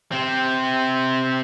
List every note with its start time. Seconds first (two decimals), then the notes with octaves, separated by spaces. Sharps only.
0.12 C3 C4